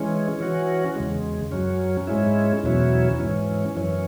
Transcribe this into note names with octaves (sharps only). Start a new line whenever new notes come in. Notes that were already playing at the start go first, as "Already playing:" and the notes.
Already playing: E3 G#3 C#4
E3 C#4 F#4
E2 C#3 G#3
F#2 F#3 C#4
G#2 G#3 C#4 E4
E2 B2 F#3 C#4 E4
G#2 E3 C#4
F#2 E3 C#4